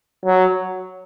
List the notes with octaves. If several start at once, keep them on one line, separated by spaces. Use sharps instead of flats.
F#3